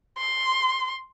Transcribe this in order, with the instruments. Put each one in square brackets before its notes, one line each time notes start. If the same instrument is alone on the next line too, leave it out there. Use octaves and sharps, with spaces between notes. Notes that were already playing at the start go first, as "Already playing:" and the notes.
[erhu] C6